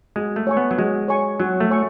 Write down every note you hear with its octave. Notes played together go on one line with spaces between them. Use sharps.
G#3 F#4
A3
C#5 G#5 C#6
B3
F#3
G#3 F#4
C#5 G#5 C#6
F#3 F#4
A3
C#5 G#5 C#6